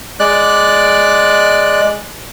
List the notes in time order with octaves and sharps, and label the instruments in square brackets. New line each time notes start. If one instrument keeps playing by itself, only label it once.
[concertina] G#3 D5 F#6